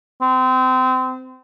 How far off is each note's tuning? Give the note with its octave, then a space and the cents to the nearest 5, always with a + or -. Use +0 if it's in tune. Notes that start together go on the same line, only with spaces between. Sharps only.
C4 -25